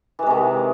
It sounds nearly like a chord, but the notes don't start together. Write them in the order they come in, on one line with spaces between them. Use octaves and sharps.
E3 G#3 C3 D#3